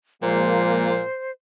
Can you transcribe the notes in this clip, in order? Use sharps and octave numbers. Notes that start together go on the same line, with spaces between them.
A#2 F3 G#3 A#3 C5